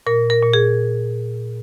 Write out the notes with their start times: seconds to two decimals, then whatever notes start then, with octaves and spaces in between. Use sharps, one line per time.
0.07 A#2 A#4
0.30 A#4
0.42 A#2
0.53 G#4